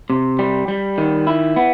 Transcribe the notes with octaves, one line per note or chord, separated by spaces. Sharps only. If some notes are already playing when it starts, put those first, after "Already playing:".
C3
G3
G3
D#3
E4
B3